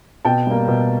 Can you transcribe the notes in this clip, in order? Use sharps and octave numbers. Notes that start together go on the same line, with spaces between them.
B2 G5 A5
G3 A#3
B2